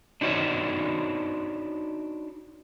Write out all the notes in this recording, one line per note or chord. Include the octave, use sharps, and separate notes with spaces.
D4 D#4 F#4 A4 C5 C#5